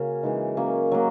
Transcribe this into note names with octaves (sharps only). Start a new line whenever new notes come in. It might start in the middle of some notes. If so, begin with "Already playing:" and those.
Already playing: C#3 A#3 C#4 F#4
C#3 E3 G#3 D#4
F#3 A#3 C#4
F#3 A#3